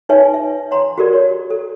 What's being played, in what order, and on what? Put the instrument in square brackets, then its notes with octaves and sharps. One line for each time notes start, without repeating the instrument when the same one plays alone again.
[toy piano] D#4 B4 C#5 E5 G#5
E5
C#5 F#5 A#5 C6
F#4 G4 A4 A#4 D5
C#5
A4